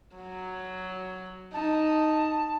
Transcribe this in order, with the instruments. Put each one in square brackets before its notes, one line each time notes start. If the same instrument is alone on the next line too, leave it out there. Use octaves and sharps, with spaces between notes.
[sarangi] F#3
[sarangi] D#4 [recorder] A5